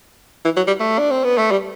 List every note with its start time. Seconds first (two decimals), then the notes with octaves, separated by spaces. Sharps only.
0.45 E3
0.57 F#3
0.67 G3
0.80 A3
0.99 D4
1.11 C4
1.24 B3
1.38 A3
1.51 G3